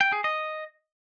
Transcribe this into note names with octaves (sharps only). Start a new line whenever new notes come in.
G5
G#4
D#5